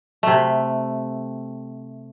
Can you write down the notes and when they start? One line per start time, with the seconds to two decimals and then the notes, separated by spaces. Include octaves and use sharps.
0.23 C3 A3